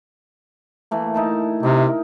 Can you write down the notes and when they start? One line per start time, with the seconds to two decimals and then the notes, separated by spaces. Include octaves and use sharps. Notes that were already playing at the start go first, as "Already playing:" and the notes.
0.91 E3 A3 A#3
1.14 D#4 E4 A5
1.63 C3 D#4 E4 A#4